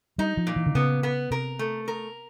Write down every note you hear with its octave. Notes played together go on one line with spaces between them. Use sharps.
G3 D#4
F3
A#2
E3
D3
C#3 B3
B3
C3 A#4
A3
A#4